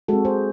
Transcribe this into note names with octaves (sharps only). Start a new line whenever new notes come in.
G#3 C4 F#4 A4
G#4 C5